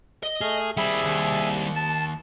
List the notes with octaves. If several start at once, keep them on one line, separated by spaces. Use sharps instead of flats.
D#5
A3 G#4 F6
D#2 G3 C4 G#4 E5 B5
D#2
A5